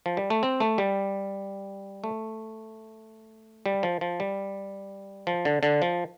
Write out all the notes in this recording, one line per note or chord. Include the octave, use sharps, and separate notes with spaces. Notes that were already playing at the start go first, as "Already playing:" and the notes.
F3
G3
A3
C4
A3
G3
A3
G3
F3
F3
G3
F3
D3
D3
F3